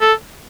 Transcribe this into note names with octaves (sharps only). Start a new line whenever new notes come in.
A4